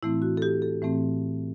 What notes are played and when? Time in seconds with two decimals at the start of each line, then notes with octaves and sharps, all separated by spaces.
0.03 A2 E3 A3 C4 E4
0.22 F#4
0.37 A4
0.42 G4
0.62 A4
0.82 A2 E3 A3 C4